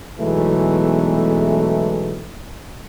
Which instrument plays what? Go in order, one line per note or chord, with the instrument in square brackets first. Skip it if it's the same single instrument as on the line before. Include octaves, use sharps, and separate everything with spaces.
[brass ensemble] B1 E2 E3 F#3 G#3 A3